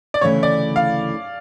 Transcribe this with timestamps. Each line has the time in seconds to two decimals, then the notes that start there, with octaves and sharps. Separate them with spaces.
0.14 D5
0.21 D2 C#3 E3 A3 E4 C#5
0.43 D5
0.76 F5